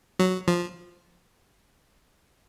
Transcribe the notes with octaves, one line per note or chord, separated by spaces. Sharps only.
F#3
F3